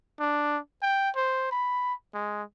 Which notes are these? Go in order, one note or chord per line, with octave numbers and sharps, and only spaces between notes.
D4
G5
C5
B5
G#3